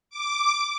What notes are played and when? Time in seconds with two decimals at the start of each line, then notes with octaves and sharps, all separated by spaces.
0.10 D6